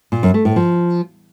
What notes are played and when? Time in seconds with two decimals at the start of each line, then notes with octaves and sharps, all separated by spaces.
0.12 A#2
0.23 F#2
0.34 A3
0.45 A2
0.56 F3